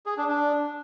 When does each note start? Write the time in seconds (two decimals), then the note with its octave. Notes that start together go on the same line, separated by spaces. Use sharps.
0.06 G#4
0.17 D4
0.29 D4